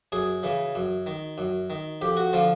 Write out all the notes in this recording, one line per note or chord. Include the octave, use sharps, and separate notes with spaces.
F#2 G#4
C#3 E3
F#2
D#3
F#2
D#3
F2 G4
F#4
D3 F3 F4